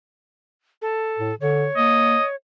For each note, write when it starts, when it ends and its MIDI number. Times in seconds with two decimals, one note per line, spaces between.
0.82 1.35 69
1.18 1.32 45
1.41 1.67 50
1.41 2.35 73
1.77 2.16 58
1.77 2.25 75